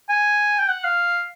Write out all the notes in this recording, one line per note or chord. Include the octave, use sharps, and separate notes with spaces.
G#5
G5
F#5
F5